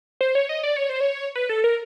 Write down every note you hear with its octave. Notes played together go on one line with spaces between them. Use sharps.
C5
C#5
D#5
D5
C#5
C5
C#5
B4
A4
A#4